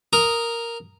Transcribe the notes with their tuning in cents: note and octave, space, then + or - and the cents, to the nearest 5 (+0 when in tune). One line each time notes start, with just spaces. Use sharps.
A#4 -5 D#6 +0